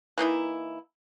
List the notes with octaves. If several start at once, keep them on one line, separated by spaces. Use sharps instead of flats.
E3 A#3 D#4 E4